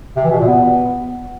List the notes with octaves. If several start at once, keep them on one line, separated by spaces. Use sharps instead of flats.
C3
E3
B2
A#2
B3